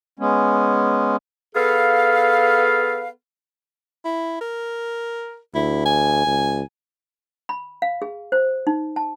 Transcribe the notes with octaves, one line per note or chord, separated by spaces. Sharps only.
G#3 B3 C#4
B3 G#4 A4 B4 F5
E4
A#4
D2 E4
G#5
C#2
B5
F5
G#4
C5
D#4
A5